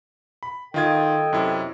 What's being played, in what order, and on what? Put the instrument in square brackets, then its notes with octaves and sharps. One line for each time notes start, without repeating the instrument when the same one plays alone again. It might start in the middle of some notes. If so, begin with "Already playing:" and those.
[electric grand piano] B5
[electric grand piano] D#3 F4 G#6 [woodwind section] A4 D#5 G5
[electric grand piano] F#2 C3 E4